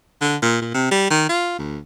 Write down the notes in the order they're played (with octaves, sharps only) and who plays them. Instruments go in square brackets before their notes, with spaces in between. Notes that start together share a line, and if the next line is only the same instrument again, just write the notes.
[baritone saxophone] D3
A#2
A#2
C3
G3
D#3
F4
D2